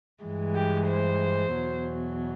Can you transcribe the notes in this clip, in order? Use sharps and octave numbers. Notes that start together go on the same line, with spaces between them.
G2 E3 G#3
G4
C5
E2 B2 F#3